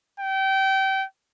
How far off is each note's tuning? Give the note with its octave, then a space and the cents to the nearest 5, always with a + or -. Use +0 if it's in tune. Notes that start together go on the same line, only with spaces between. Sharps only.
G5 -25